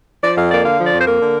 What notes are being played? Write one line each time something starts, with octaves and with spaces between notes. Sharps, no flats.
F3 D5
F2 F5
A#3 D5
D3 F5
F3
D5
F2
C5
A#3 A#4
D3